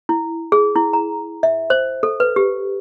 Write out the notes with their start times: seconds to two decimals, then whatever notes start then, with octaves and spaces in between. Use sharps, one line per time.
0.09 E4
0.52 G#4
0.76 E4
0.93 A#5
1.43 E5
1.70 C5
2.03 A4
2.20 B4
2.36 G4